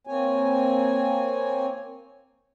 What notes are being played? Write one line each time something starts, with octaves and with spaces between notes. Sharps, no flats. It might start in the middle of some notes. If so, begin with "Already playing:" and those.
A#3 C4 C#5 G#5